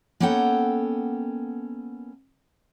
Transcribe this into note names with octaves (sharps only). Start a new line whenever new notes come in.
A#3 B3 C#4 A4 F#5 G5